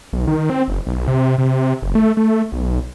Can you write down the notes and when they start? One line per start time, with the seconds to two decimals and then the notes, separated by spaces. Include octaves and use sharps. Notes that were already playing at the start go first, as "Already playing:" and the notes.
0.13 B1
0.27 D#3
0.50 C4
0.68 F#1
0.87 B1
1.08 C3
1.38 C3
1.83 F#1
1.95 A3
2.17 A3
2.52 B1